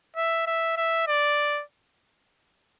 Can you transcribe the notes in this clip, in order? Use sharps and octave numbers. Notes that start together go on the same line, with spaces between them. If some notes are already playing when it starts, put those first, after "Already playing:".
E5
E5
E5
D5